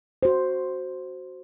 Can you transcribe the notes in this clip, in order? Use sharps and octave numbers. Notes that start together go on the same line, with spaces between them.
F#4 C5